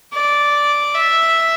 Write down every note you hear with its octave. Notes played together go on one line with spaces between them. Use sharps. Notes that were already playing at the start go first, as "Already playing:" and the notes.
D5
E5